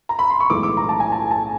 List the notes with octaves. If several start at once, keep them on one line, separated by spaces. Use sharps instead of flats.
A#5
B5
C6
C#6
B1 A2 E3 G#3 D6
D6
A#5
A5
G#5
A5
A5